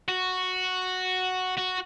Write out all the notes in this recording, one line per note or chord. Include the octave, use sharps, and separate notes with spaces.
F#4
F#4